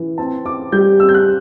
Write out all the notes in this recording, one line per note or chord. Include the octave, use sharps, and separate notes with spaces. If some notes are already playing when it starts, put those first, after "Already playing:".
Already playing: E3
C4 A5
C4 D6
G3 G6
C4 E6
G6
F#6